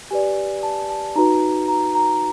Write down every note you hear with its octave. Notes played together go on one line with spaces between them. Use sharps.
G4 B4 D5 G#5
A5
A5
D#4 F#4 B4 A#5
A#5
A#5